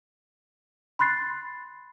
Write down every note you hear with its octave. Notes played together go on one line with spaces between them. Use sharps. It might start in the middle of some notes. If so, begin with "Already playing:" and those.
B5 C6 F#6 A6 C7